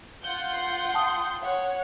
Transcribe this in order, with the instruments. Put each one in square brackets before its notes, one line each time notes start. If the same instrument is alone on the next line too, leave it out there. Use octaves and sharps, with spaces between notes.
[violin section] F4 F#5 G6 [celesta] G7
[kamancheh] C6
[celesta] G5 A5 D#6
[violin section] C#5 [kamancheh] F#5